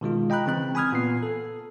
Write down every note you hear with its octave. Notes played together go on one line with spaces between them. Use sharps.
B2 D#3 G#3 F4
D#5 G5 A#5 B5 F#6
C#3 E3 C4 F#6
G#5 B5 D#6 F6 G#6
A#2 B3 C7
A4